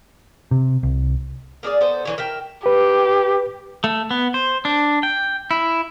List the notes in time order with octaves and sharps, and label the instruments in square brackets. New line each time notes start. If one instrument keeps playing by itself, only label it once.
[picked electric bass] C3
C2
[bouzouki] A#3 D4 G#4 D5
B3 A4 C5
D3 E3 C#5
A#4 E5 G5
[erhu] G4 [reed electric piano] B4
[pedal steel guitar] A3
B3
C5
D4
G5
E4